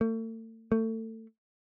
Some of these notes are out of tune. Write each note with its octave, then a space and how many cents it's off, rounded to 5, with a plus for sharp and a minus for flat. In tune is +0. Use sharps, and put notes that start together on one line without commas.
A3 +40
A3 +25